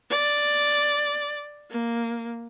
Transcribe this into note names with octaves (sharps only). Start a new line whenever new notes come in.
D5
A#3